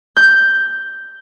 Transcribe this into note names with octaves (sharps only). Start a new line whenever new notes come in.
G6